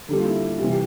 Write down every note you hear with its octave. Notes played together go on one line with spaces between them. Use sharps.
D3 G3 A#3 A4
F4
E4
F4
C3 E3 G3 F4
G4